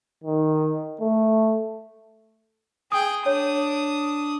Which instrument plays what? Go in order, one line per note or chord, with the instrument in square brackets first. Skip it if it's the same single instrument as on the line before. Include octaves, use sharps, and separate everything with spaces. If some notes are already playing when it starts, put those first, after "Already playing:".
[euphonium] D#3
A3
[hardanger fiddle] G#4 G5 [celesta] D#6
[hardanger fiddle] D4 D#6 [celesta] C#5